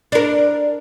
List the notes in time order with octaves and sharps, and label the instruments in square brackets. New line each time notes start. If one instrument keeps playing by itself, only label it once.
[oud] D4 A#4